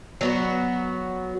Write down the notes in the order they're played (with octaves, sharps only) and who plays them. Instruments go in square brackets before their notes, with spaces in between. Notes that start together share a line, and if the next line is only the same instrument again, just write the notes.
[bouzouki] F#3 B3 F#4